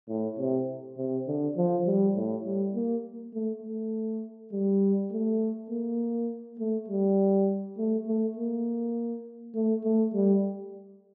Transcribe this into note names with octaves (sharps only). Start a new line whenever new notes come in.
A2
C3
C3
D3
F3
G3
A2
G3
A#3
A3
A3
G3
A3
A#3
A3
G3
A3
A3
A#3
A3
A3
G3